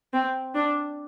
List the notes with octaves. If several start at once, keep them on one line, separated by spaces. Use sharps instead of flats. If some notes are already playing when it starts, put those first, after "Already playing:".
C4
D4